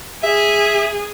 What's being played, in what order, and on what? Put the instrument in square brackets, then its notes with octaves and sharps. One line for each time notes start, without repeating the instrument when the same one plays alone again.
[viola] G#4 [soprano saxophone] E5